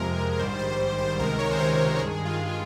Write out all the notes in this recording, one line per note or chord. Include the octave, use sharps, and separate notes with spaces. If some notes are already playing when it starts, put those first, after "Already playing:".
Already playing: F2 C3 F3 G#3 A#4
A#1 G#2 D#3 G3 C5
C5
C5
C5
C#2 C3 D#3 G#3 A#4
C#5
C5
C#5
C5
G2 D#3 G#3 G#4
F4